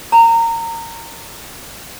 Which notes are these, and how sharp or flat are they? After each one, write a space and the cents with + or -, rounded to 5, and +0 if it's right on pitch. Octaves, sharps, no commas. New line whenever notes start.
C#5 +30 A#5 -25